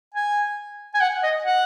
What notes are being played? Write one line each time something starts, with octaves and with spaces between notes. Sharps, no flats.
G#5
G#5
F#5
D#5
F#5